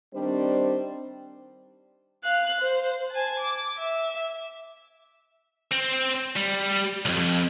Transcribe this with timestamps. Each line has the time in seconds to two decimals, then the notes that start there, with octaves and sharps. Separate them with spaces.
0.13 D#3 G3 C4 D4 C5
2.24 F5 F#6
2.60 C5
3.11 G#5 A5
3.39 D6
3.79 E5
5.71 C4
6.36 G3
7.05 B1 F2